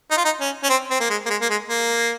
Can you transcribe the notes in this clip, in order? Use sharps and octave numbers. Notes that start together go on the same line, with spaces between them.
D#4
F4
D#4
C#4
C#4
C4
C4
A#3
G#3
A#3
G#3
A#3
G#3
A#3